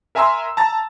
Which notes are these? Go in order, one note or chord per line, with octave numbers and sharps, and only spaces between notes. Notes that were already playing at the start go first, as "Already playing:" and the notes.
A#4 E5 G#5 A#5 C6 E6
A5 A#5 A6